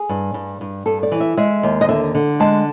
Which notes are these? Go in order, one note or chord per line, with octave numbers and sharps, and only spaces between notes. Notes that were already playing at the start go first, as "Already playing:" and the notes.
Already playing: G#4
G2
G2
G2
G2 A4
D5
E3
E5
G#3 E5
D#2
D#5
D3 E5
D3
G#3 A5